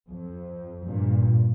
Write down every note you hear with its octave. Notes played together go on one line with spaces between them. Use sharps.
F2
G2 A#2